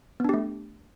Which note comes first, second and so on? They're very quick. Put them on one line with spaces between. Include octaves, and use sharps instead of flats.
B3 D4 G4 A3